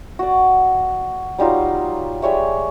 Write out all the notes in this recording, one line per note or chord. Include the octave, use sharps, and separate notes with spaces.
F#4 D5
F#3 G3 D#4 F4
G3 G#3 C#5 E5